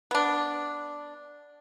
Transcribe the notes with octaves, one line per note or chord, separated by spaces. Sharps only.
B3 D4